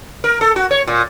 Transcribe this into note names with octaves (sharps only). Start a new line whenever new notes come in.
A#4
A4
F#4
C#5
A#2